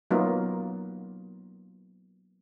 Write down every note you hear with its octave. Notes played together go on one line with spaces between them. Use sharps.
F#3 A#3 B3 D#4 F4